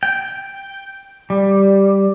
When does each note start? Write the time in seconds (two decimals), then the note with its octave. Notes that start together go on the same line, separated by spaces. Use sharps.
0.03 G5
1.30 G3